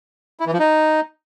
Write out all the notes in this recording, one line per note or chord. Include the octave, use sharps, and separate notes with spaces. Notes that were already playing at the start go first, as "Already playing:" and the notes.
E4
E3
F3
D#4